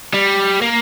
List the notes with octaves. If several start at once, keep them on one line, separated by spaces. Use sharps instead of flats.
G3
A#3